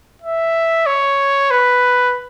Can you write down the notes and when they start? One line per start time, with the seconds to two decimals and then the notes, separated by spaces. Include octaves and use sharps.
0.22 E5
0.86 C#5
1.51 B4